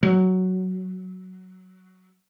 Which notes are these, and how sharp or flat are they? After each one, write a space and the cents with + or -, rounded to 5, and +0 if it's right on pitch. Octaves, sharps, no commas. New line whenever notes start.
F#3 +5